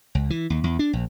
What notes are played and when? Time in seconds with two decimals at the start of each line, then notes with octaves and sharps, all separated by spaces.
0.15 C#2
0.30 E3
0.50 D#2
0.64 E2
0.79 D4
0.93 A#1